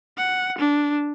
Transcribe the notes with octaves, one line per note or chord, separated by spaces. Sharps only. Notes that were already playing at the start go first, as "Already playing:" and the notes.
F#5
D4